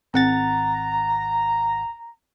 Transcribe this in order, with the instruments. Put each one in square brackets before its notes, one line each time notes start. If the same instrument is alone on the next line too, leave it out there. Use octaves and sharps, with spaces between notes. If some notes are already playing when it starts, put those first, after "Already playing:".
[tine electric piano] G#1 F#5 A6 [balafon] C4 [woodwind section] A#5